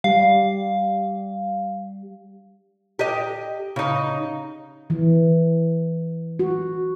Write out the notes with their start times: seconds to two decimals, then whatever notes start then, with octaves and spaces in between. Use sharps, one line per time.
0.04 G3 F5
2.99 G4 D#5
3.76 C#3 D#4
4.90 E3
6.39 F#4